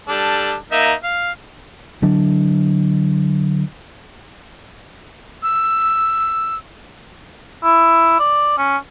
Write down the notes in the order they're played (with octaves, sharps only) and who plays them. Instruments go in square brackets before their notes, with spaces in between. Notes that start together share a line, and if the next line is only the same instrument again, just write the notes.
[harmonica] G3 D4 A4
A#3 D#4 E5
F5
[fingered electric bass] D3 F#3 D4
[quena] E6
[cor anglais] E4
D5
C#4